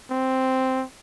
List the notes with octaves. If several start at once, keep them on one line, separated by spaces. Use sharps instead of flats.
C4